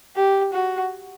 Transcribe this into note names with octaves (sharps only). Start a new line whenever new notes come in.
G4
F#4